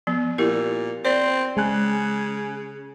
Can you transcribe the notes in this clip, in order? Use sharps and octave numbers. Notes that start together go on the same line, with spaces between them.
F3 B3
A#2 E4 G4 A#4
C4 C5 D5
C#3 G#3 G#5 F#6